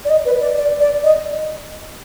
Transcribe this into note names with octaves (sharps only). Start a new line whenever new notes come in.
D5
D#5
B4
D5
D5
D5
D#5